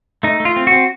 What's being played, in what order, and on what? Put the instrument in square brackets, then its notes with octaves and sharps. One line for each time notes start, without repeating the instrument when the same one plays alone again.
[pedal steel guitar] A3 D#4
A3
F4
C4
F#4
C4